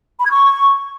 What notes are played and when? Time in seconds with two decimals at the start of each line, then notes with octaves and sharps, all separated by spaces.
0.19 B5
0.25 G#6
0.31 C#6